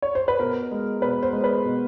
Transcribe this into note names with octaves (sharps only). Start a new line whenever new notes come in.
C#5
C5
B4
B2 A#4
G#3
B2 B4
C5
G#3
B4
B2